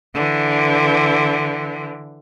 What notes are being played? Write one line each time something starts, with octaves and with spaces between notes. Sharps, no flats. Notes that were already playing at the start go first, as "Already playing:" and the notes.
D3 E3